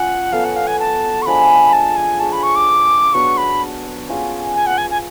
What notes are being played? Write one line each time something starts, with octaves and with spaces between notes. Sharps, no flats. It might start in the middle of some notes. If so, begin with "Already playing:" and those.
Already playing: C#4 F4 F#5
F#3 B3 F#4 A4 F5
F#5
F5
G#5
A5
C#6
F3 G#3 D4 G#4 B5
A5
G#5
D4 G#4 C#5 A5
B5
C#6
D6
F#3 B3 D4 F#4 C#6
B5
C#4 F4 G#4
G#5
F#5
G#5
G#5